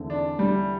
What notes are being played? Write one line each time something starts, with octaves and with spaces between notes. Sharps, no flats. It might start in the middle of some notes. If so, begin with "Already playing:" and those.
Already playing: E2 D3 A3 C4
D4
G3